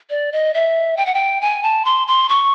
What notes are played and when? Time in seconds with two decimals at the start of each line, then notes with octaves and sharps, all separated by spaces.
0.10 D5
0.32 D#5
0.54 E5
0.97 G5
1.06 F#5
1.14 G5
1.41 G#5
1.63 A5
1.85 C6
2.08 C6
2.29 C#6